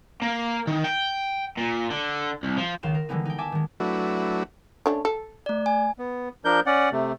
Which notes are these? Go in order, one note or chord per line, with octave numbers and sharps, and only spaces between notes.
A#3
D#3
G5
A#2
D3
C2
F3
C#2 D#3 F5 C6 E7
A#4
D3 E3 G3 G#3 B3 D#4
D#4 G5
E5 G#5 A5 D6
D#3 G#3
F#3 A3 D4 E4 F#4 B4
A3 C#4 D4
A4
A3 D5
G#5
B3
F3 D4 A#4 G6
C#4 D5 F#5
C3 A3